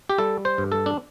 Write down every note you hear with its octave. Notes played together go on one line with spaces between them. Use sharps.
G4
G3 A4
C5
G2
A4
D4